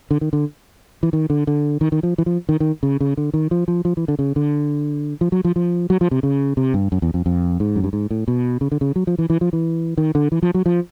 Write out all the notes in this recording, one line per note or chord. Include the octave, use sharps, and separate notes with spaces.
D3
D#3
D3
E3
D#3
D3
D3
D#3
D#3
F3
E3
F3
D#3
D#3
C#3
C#3
D3
D#3
F3
F3
F3
E3
D3
C#3
D3
F3
F#3
F3
F3
F#3
F3
C3
C#3
C3
G2
F#2
E2
F2
F2
G#2
F#2
G2
G#2
A2
B2
C#3
D3
C#3
F#3
F3
E3
E3
F3
E3
D#3
D3
E3
F3
F#3
F3